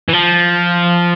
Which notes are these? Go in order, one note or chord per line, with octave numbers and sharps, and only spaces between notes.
E3
F3